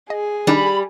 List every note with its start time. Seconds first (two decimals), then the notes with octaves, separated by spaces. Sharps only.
0.10 G#4 D#5
0.47 D#3 G3 D4 D#4 B5